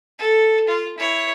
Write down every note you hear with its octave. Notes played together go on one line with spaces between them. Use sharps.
A4
F4
E4 C#5